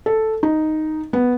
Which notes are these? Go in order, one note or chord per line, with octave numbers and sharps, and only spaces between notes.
A4
D#4
B3